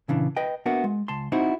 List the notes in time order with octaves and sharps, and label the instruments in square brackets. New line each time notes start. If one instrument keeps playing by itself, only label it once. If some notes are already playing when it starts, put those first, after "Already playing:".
[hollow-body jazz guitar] A#2 C#3 E3 D4
B4 D#5 G5
A#3 B3 D4 F#4 A#4 E5
G#3
C#2 A5 C6
C4 D#4 E4 F#4 C5 F#5